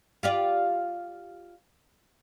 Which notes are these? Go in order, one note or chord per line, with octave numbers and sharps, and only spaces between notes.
F4 G4 D5